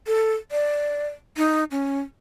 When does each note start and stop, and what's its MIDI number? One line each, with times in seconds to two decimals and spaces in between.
0.07 0.34 69
0.52 1.05 74
1.37 1.64 63
1.71 2.00 61